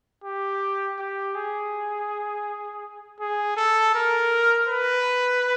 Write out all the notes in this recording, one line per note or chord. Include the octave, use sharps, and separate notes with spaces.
G4
G4
G#4
G#4
A4
A#4
B4